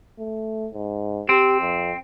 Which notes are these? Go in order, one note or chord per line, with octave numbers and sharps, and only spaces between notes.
A3
G#2
C4 G4
F2